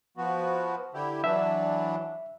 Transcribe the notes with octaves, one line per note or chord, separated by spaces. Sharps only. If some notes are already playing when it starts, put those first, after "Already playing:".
F3 B3 F#4
D3 E4 G4
E3 F#3 D4 E5